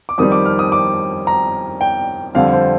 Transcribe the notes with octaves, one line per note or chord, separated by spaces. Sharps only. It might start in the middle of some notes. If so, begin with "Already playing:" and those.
D6
F2 D#3 G3 D#6
D6
F6
D#6
D6
A#5
G5
F2 D3 G3 F5
C5